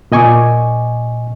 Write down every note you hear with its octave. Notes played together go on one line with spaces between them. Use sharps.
A#2 D#5 G#5 C#6 D6